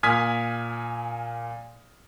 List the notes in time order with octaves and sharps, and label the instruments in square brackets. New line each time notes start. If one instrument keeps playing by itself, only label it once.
[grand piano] A#2 G#5 D#6 F6 G#6 B6